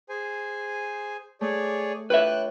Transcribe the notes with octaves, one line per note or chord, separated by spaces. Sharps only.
G#4 C5 G#5
A3 G#4 C#5 D5
D4 F4 B4 C#5 E5 G5 F#6